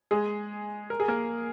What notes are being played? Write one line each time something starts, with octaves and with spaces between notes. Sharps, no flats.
G#3 G#4
A#4
G#4
A#3 A#4